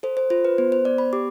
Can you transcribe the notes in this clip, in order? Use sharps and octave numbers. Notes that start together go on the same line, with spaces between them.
A4 C5
C5
F4 C5
B4
B3 C5
C5
B3 D5
B5
G4 D6